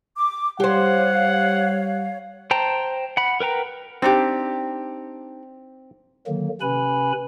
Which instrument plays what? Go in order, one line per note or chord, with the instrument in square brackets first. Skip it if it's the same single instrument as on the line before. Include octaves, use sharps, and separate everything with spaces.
[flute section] D6
[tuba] G3 [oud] G4 C5 [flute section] C#5 F5 [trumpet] F#5
[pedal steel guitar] C5 G5 A5 A#5
F#5 B5
A#4 B4 G5 A#5
[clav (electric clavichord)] C4 [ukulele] D4 D#4 G4
[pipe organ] D3 D#3 F#3 A#3
C3 C#4 B4 G#5 B5